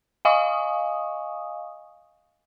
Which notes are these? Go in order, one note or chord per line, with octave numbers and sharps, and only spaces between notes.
D#5 F5 G#5 C#6 D#6